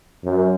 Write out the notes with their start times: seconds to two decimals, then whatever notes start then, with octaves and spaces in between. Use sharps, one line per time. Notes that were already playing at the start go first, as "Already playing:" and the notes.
0.24 F#2